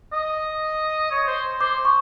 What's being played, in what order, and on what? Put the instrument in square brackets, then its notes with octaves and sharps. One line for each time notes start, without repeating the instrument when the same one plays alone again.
[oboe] D#5
C#5
C5
[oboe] C5 [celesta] D6
[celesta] C#6